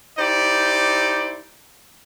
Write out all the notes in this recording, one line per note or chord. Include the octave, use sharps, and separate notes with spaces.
D#4 E4 G4 C5 D5